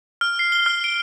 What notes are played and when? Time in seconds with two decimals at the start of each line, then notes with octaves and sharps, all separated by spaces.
0.21 F6
0.39 C7
0.52 G7
0.66 F6
0.84 D7